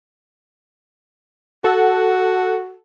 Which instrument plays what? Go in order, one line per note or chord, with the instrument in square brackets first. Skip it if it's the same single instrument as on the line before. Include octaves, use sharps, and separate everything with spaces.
[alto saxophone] F#4 [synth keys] A4 F#5